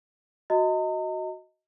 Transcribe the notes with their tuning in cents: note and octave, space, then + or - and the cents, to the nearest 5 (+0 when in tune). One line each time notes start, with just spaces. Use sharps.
F#4 +0 D#5 +15 A#5 -40